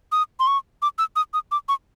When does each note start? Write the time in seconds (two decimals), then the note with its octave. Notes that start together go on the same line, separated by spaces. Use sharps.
0.12 D#6
0.40 C6
0.47 C#6
0.82 D6
0.98 E6
1.16 D#6
1.34 D#6
1.52 D6
1.69 C#6